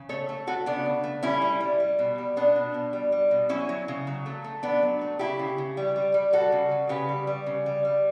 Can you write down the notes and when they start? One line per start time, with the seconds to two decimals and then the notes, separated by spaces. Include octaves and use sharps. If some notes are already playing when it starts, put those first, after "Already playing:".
Already playing: C#3
0.09 A3 A4 C#5
0.29 A3
0.47 A3 F#4 A4
0.66 C#3 B3 D4
0.86 C#3
1.04 A3
1.23 G3 C#4 E4
1.42 G3
1.61 G3
1.80 G3
1.99 B2
2.18 G3
2.36 B2 B3 D4
2.56 B2
2.74 B2
2.93 G3
3.12 G3
3.31 B2
3.49 F#3 C#4 E4
3.69 F#3
3.88 C#3
4.07 F#3
4.26 A3
4.44 A3
4.63 A3 B3 D4
4.82 F#3
5.01 A3
5.19 C#3 E4 G4
5.39 C#3
5.58 C#3
5.77 G3
5.96 G3
6.14 G3
6.33 G3 F#4 A4
6.52 C#3
6.71 C#3
6.89 C#3 G4 B4
7.09 G3
7.27 G3
7.46 C#3
7.66 G3
7.85 G3